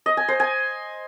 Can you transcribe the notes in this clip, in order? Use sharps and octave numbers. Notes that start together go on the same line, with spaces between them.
D#5
G#5
C5
G#5